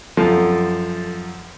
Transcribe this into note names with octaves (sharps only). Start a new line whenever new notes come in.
F#2 F3 A4 A6